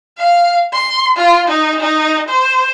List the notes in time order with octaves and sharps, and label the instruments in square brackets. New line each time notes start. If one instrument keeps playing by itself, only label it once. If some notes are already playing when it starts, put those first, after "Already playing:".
[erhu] F5
C6
F4
D#4
D#4
C5